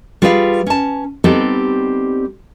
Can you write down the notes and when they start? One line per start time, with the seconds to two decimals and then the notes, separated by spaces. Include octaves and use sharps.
0.22 G3 F4 G#4 B4 D#5 F5
0.67 C#4 A5
1.24 G3 B3 C4 D#4 G4 A4